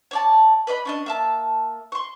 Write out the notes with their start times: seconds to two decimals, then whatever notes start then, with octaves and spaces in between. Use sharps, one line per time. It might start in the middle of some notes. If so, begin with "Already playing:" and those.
0.11 C#5 D5 A5
0.67 B4 D5 D#5 B5
0.85 C#4 D4 D#5
1.06 A#3 E5 A5
1.92 C6 C#6